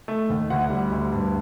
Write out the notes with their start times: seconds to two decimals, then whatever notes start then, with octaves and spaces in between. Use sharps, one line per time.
0.08 A3
0.30 D#2
0.50 D2 F#5
0.70 G3
0.91 D2
1.12 G2